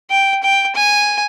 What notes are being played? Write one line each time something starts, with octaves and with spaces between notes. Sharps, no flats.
G5
G5
G#5